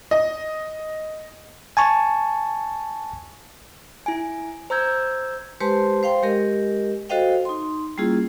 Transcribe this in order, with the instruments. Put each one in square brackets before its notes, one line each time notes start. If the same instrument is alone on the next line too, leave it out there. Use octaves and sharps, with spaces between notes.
[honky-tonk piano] D#5
[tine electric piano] G#5 A5 C#6
[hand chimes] E4 G#5
C5 A#5 E6 G6 G#6
[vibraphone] G#3 G4 B4 C5 A5 C6
C5 F5 G5 C6
G#3 G4 A#4 D#5
F#4 A4 C5 D#5 F5 G5
D#4 C6
G3 A#3 C#4 E4 F4 G#4